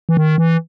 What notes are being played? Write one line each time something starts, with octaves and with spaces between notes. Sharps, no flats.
E3
D#3
E3